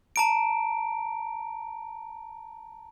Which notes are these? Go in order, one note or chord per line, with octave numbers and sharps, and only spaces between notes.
A5 A#5 D7